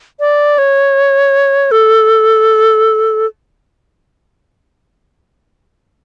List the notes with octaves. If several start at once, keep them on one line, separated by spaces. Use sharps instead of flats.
D5
C#5
A4